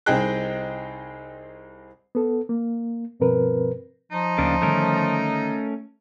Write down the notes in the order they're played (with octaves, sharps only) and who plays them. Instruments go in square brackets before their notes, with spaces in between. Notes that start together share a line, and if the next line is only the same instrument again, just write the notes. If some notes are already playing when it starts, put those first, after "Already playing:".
[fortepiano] C2 C4 D#4 G#4 G5 F#6
[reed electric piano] B3 A4
A#3
G2 B2 F3 C4 A#4 B4
[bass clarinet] F3 [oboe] D#4
[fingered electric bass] D2 [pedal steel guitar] C#3 A#3 D4
[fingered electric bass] D3 D#3 G3 [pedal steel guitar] A3 C#4 A#4